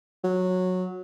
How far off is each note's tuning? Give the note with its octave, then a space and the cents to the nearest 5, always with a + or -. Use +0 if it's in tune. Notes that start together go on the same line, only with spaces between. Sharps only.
F#3 -10